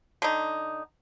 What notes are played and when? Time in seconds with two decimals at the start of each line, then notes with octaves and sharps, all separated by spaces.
0.22 D3 D#4